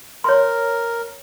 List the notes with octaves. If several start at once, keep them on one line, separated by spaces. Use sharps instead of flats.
A#4 C#5 C6